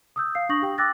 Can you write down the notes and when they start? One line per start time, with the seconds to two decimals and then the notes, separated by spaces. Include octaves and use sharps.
0.16 D#6 E6 G6
0.35 F5 C7
0.49 D4 C#6 D#6 G6 A#6 F#7
0.62 G4 G5
0.78 G5 D6 E6 F#6 A6 A#6